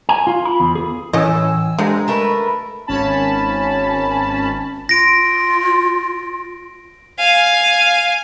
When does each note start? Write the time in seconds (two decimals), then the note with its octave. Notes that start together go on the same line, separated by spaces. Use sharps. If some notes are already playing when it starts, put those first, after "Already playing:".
0.09 G#5
0.27 F4
0.45 B5
0.60 E2
0.75 G#4
1.13 A2 E3 A3 C#4 D#5 G#5 E6
1.78 D3 F3 G3 G#3 A#5
2.08 A3 A#4 B4
2.87 G#1 C#4 A5 B5
4.89 F4 A#6 D7
7.19 F5 G#5